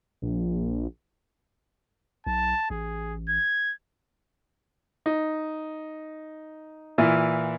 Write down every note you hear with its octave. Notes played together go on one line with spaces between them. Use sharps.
A#1
B1 A5
A1 G#4
G#6
D#4
A#2 E3 E4 F4 F6